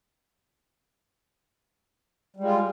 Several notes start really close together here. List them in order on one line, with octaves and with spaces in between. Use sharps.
G3 G#3 F4